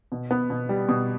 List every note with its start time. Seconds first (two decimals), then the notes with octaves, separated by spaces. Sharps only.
0.12 B2
0.31 B3
0.50 B2
0.69 G3
0.89 B2